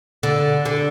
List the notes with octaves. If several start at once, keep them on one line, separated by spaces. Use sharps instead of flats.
D3
D3